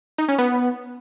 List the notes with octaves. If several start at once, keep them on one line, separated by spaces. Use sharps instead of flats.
D#4
C#4
B3